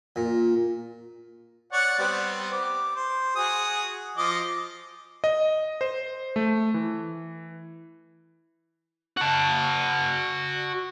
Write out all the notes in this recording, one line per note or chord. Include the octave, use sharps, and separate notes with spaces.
A#2
C#5 D5 F#5
G3 B3 C4
D6
C5
F#4 G#4 D#6
F3 D#5 D6
D#5
C5
A3
E3
F#4 A5